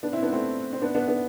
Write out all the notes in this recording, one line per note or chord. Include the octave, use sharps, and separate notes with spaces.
B3 D4
C4 E4
B3 D4
A3 C4
C4
B3 D4
B3 D4
B3 D4